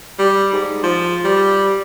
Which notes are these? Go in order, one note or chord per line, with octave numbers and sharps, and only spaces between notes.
G3
G#2
F3
G3